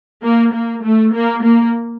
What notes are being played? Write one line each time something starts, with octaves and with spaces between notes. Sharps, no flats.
A#3
A#3
A3
A#3
A#3